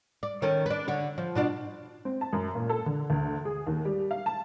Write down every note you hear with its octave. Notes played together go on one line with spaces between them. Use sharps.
D5
D#3 C#4 A4
D4 B4
D3 C#5
F3
B2 D4 F4
C4
A5
F#2
A#2
A4
D3
D2
G#4
D#2
G3
F5
A5